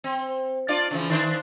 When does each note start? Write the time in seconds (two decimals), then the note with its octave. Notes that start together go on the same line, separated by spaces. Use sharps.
0.04 C4
0.68 D4 F4 D5
0.91 C#3 E3 F3
1.10 D#3 D4 C5